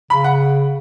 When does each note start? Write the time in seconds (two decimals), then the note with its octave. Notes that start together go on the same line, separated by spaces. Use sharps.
0.10 C#3 B5
0.24 F#5